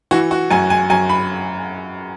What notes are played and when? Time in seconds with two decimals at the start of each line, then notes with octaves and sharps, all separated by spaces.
0.11 E3 F#4
0.31 F#4
0.50 F#2 G#5
0.70 G#5
0.90 F#2 G#5
1.09 B5